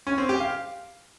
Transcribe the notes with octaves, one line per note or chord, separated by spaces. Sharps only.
C#4
C4
G4
F5